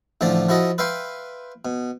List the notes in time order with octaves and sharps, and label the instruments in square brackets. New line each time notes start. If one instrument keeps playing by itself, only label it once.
[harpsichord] A1 D3 F3 D4 D5
F3 E4 F#4 A4 D#5
B4 E5 F5 G5 C6
B2